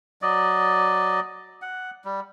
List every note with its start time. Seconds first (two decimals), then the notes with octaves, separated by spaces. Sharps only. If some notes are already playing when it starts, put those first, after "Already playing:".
0.22 F#3 D5 D#5
1.62 F#5
2.05 G3